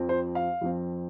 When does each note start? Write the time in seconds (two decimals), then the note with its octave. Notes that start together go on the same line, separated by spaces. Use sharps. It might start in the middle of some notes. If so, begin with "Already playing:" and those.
Already playing: F2 F3 C4
0.09 C5
0.35 F5
0.61 F2 F3 C4